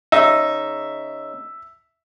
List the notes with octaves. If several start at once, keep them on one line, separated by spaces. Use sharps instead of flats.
C#3 D#4 E5